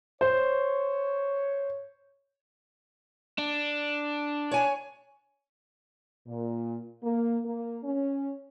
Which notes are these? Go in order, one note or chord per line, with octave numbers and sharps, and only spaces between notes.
C5 C#5
D4
C#5 G#5
A#2
A#3
A#3
C#4